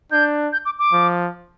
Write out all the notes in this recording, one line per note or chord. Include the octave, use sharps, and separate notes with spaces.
D4 G6
G6
D6
D6
F3